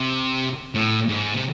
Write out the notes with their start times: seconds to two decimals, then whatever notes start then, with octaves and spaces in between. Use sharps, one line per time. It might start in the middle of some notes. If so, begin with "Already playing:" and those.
Already playing: C3
0.75 A2
1.09 G#2
1.34 C3